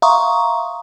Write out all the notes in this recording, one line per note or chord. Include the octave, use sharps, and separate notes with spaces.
E5 F5 A#5 C6 C#6 D#6